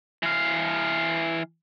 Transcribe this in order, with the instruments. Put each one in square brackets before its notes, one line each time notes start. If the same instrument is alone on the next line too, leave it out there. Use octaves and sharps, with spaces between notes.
[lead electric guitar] E3 F5